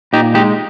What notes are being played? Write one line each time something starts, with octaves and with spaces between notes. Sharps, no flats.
A#2 D#4 G4
G#3 D#4 G4